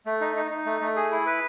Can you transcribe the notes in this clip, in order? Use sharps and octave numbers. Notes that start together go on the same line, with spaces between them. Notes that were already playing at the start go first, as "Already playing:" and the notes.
A3
D#4
D#4
D#4
A3
A3
G#4
E4
B4